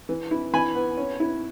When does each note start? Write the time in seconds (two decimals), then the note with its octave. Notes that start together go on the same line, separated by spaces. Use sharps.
0.09 E3
0.31 E4
0.53 E3 G#5 B5
0.75 B3
0.97 C#4
1.20 E4